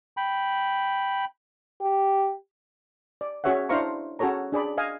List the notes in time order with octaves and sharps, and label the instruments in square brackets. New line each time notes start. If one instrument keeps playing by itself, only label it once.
[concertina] G5 B5
[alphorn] G4
[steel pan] D5
C#4 F#4 G#4 C#5 E5 F#5
D4 E4 C5 F5 A#5 C#6
C#4 F#4 G#4 A4 C#5 A#5
D4 G#4 D5 B5
D#5 F5 G#5